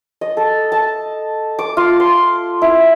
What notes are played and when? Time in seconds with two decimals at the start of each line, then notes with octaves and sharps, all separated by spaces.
0.21 D#5
0.37 A4
0.72 A5
1.59 D6
1.77 F4
2.00 C6
2.62 E4